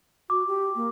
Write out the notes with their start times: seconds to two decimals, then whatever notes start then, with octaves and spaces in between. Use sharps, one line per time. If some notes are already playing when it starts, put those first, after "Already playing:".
0.30 F#4 D6
0.47 G4
0.75 A#3